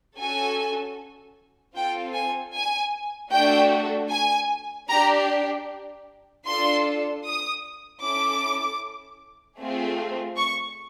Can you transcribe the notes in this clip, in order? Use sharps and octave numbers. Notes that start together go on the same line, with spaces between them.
C#4 F#4 A4 G#5
C4 F4 A4 G5
G#5
G#5
A3 D4 F#4 A4 G5
G#5
D4 G4 A#5
D4 F4 A4 C6
D#6
C#4 E4 A4 D6
A3 C4 F4 G#4
C#6